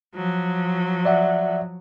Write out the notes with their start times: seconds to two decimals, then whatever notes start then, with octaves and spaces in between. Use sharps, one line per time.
0.14 F3 F#3
1.05 D5 E5 F#5